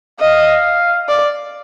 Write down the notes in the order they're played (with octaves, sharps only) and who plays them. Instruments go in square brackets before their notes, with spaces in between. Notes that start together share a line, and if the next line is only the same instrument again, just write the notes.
[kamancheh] D#5 [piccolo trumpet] F5
[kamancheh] D5